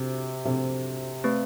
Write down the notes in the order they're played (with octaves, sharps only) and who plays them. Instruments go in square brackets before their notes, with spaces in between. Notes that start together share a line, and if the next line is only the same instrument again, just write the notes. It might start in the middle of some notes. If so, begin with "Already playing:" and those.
Already playing: [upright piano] C3 [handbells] D4 F#4 A4 C5
[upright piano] C3 [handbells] D4 F#4 A4 C5
[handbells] A3 C4 G4 B4